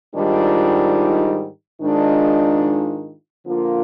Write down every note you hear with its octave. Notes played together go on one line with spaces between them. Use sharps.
G#2 D#3 G3 D4 F4
G#2 D#3 G#3 D4 F4
D3 F3 A#3 F4